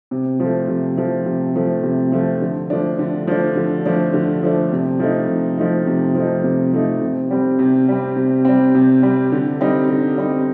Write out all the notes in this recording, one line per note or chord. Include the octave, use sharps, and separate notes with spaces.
C3
F3 A3
C3
F3 A3
C3
F3 A3
C3
F3 A3
D3
F3 A3 D4
D3
F3 A3 D4
D3
F3 A3 D4
D3
F3 A3 D4
C3
F3 A3 D#4
C3
F3 A3 D#4
C3
F3 A3 D#4
C3
F3 A3 D#4
C3
G3 C4
C3
G3 C4
C3
G3 C4
C3
G3 C4
D3
G3 C4 D#4
D3
G3 C4 D#4